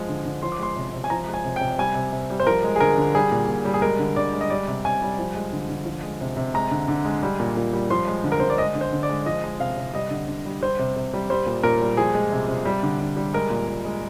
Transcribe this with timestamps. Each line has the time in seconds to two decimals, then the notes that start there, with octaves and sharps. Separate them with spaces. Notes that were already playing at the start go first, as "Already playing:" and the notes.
Already playing: F3 G#3
0.09 D3
0.25 D3
0.42 F3 C6
0.52 D6
0.59 G#3 C6
0.76 C3
0.93 C3
1.04 G#5
1.10 F3 A#5
1.27 G#3
1.34 G#5
1.45 C3
1.56 G5
1.61 C3
1.79 G3 G#5
1.95 C3
2.13 C3
2.30 G3
2.40 C5
2.47 F3 A#4
2.64 G#3
2.76 G#4
2.80 D3 A#4
2.97 D3
3.15 G3 G#4
3.32 A#2
3.48 A#2
3.65 G3
3.74 G#4
3.82 G#3 A#4
3.99 D3
4.16 D3 D5
4.33 G#3
4.41 D#5
4.50 G3 D5
4.68 C3
4.84 C3 G#5
5.02 G3
5.19 F3
5.35 G#3
5.53 D3
5.69 D3
5.86 F3
6.03 G#3
6.21 C3
6.37 C3
6.54 G#3 A#5
6.71 D3
6.88 D3
7.05 G#3
7.23 G3
7.40 A#2
7.57 A#2
7.73 G3
7.90 F3 C6
8.07 G#3
8.24 D3
8.32 A#4
8.40 D3 C5
8.50 D5
8.58 G#3 D#5
8.75 D3
8.81 C5
8.93 D3
9.03 D5
9.09 G#3
9.26 F3 D#5
9.44 G#3
9.60 C3 F5
9.77 C3
9.93 G3 D#5
10.11 D3
10.28 D3
10.45 G3
10.61 G3 C5
10.79 C3
10.97 C3
11.14 G3
11.30 G3 C5
11.46 A#2
11.63 A#2 A#4
11.81 G3
11.97 F3 G#4
12.15 G#3
12.32 C3
12.49 C3
12.65 G3
12.83 D3
13.00 D3
13.17 G3
13.33 G#3 A#4
13.50 A#2
13.68 A#2
13.85 G#3